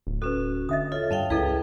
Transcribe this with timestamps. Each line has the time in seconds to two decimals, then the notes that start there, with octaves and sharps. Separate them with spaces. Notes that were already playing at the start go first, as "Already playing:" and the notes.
0.07 D1
0.22 C#4 F#4 A4 B4
0.69 D2 D#5 E5 D#6
0.92 F4 A4 C#5
1.11 G2 E5 F5 G5 A5
1.30 C#2 E4 G#4 A4 B4 D#5 G5